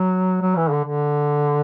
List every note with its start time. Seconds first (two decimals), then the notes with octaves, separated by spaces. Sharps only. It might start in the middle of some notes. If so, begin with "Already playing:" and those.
Already playing: F#3
0.42 F#3
0.56 E3
0.70 D3
0.84 D3